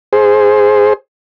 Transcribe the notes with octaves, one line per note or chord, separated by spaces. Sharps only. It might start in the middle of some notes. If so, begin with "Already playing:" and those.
G#4 C5